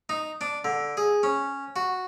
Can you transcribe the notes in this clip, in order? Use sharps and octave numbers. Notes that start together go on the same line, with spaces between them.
D#4
D4
D3
G#4
C#4
F#4